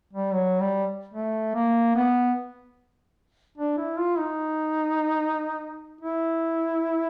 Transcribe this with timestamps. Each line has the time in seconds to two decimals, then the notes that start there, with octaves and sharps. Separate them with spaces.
0.13 G3
0.33 F#3
0.60 G3
1.14 A3
1.55 A#3
1.96 B3
3.57 D4
3.77 E4
3.98 F4
4.18 D#4
6.01 E4